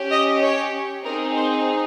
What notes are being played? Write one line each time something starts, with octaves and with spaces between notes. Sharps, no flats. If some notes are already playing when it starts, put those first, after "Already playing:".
Already playing: C#4 G4
D#5
C#5
C4 D#4 G#4 A#4
C5